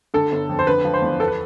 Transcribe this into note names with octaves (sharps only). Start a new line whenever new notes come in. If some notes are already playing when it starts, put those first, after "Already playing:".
D3 A4
G1
F2
C5
D3 B4
F3
C5
E2
B3 A4
B4